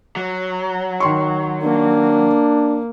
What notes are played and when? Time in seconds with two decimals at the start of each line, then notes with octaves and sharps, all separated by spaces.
0.16 F#3
1.00 D#3 C6 C#6
1.62 A#3 D4